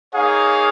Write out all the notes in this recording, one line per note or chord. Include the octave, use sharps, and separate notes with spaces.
A#3 D#4 G#4 C#5 F5